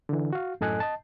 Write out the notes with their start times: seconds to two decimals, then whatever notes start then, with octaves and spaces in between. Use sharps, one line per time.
0.09 D3 E3
0.33 F#4 F5
0.61 F#2 A2 A4 D#5 G#5 F#6
0.80 D#5 A5